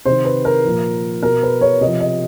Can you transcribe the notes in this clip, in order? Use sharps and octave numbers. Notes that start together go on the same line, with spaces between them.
C3 D#3 C5
B4
A#4
A#2 F3
B2 A#4
B4
C#5
C3 F3 D#5
D#5